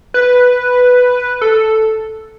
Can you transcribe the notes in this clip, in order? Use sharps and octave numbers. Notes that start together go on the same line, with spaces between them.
B4
A4